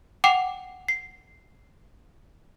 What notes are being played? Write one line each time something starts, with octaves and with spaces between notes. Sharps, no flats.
F#5 G5 D6 C7 E7 F7
C7